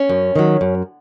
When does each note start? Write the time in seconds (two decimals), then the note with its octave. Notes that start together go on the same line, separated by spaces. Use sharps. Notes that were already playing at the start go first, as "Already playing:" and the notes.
Already playing: C#4
0.09 F#2
0.36 D#3 F#3
0.61 F#2